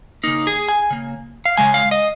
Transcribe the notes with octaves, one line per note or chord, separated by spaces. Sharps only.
C#3 A#3 D#4
G#4
G#5
C#3 A#3
F5
C#3 G#3 G#5
F5
D#5